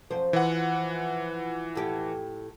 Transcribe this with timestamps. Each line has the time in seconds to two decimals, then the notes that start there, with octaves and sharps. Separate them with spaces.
0.11 F#2 F3 C5
0.33 E3 F3 F#5
1.75 A2 G4